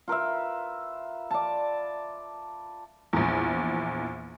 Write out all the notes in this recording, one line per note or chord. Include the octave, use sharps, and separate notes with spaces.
F4 A#4 B4 E5
D5 A5
A#1 E2